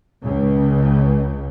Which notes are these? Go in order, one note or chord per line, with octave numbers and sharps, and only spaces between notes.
C#2 C#3